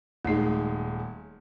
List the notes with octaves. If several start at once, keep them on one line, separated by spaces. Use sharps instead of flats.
D#1 G#3 A3 D#4